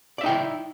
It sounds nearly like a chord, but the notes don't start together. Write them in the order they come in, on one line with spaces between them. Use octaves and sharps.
D5 E5 D#4 G5 E4